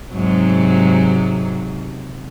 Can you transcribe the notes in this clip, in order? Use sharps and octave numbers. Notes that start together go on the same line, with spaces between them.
G#2 C3 F#3